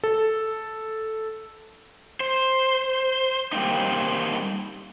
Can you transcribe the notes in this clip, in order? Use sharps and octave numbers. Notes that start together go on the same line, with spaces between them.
A4
C5
G3 A#3 C4 D#4